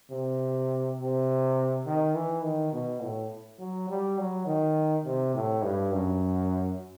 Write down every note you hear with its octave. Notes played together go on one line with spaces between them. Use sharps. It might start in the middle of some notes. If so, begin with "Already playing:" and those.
C3
C3
D#3
E3
D#3
B2
A2
F#3
G3
F#3
D#3
C3
A2
G2
F#2